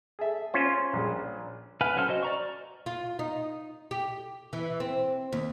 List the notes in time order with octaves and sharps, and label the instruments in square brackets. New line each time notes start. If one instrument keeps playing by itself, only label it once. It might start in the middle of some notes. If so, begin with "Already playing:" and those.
[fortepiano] G#4 A4 E5
[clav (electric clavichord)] C#4 F4 C5
[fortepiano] A#1 G3 G#4
[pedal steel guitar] B4 F5 F#5 G#5
F#3 C#4 A4 C5 F6
F#4 C5 D#5
D5 A#5 C#6
[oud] F4
D#4
G4
E3
C4
D#2